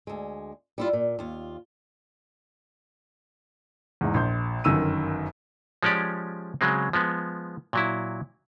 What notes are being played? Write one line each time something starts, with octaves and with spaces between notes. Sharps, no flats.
D2 G#3
G3 E4 F4
A#2
D#2 F4
E2 G#2
A#1 C6 G6
G1 F#2 D#3 E6 D#7
F3 G#3 C#4 G4 D5
C#3 F#3 G#3 C4
F3 G#3 B3
A#2 F#3 E4